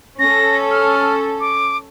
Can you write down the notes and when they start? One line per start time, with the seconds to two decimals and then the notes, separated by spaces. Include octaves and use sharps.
0.19 C#4 A4 A#6
0.71 F6
1.40 D6